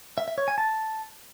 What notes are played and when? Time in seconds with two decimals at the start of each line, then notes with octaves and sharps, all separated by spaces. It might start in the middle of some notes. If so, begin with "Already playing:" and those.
0.18 E5
0.28 E5
0.38 C#5
0.48 G#5
0.58 A5